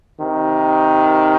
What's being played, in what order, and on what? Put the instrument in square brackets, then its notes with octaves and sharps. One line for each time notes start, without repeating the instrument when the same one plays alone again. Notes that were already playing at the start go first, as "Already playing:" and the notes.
[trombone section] C3 D#3